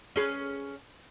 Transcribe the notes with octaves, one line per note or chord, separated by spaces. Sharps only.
C#4 G#4 B4